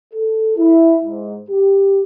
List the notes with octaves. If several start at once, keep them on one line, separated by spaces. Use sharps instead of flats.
A4
E4
G#2
G4